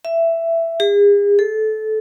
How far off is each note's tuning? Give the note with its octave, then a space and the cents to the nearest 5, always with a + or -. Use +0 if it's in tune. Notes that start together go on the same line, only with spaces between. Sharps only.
E5 +10
G#4 -40
A4 -20